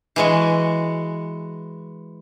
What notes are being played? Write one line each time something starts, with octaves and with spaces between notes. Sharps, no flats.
E3 G#3 F#4